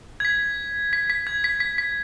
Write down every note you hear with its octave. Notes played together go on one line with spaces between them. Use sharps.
G#6
B6
B6
B6
G#6
B6
B6
B6